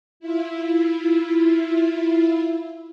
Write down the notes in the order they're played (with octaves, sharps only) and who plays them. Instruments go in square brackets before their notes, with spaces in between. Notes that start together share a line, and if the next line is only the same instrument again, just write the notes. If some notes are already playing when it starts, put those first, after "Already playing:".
[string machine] E4 F4